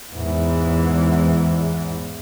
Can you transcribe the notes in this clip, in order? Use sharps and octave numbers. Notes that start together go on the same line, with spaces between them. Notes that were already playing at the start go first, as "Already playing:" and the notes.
E2 G#2 E3